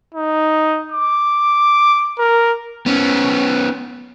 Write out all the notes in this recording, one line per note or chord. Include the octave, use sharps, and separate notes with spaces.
D#4
D6
A#4
B3 C#4